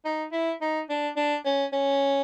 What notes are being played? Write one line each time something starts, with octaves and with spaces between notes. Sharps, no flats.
D#4
E4
D#4
D4
D4
C#4
C#4